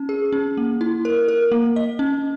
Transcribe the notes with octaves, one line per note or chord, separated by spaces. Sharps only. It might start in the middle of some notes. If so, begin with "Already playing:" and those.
Already playing: C#4
G#4
C#4
A#3
E4
A#4
A#4
A#3
D#5
C#4